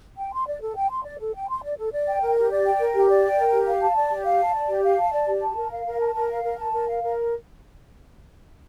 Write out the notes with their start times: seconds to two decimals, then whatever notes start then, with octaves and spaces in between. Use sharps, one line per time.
0.18 G5
0.32 C6
0.47 D5
0.61 A4
0.76 G5
0.90 C6
1.05 D5
1.20 A4
1.34 G5
1.49 C6
1.63 D5
1.78 A4
1.92 D5
2.07 G5
2.21 A#4
2.37 G4
2.51 D5
2.65 G5
2.80 A#4
2.95 G4
3.09 D5
3.23 G5
3.38 A#4
3.53 G4
3.67 F5
3.82 A5
3.96 D5
4.11 G4
4.25 F5
4.40 A5
4.54 D5
4.69 G4
4.84 F5
4.99 A5
5.13 D5
5.28 G4
5.42 A5
5.56 A#4
5.71 F5
5.86 A#4
6.00 A5
6.14 A#4
6.30 F5
6.44 A#4
6.58 A5
6.73 A#4
6.88 F5
7.02 A#4